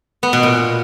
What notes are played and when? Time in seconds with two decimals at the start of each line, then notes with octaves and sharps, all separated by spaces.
0.23 B3
0.33 B2
0.43 A#2